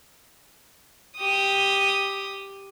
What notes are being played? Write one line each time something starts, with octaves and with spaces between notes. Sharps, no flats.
G4 D#6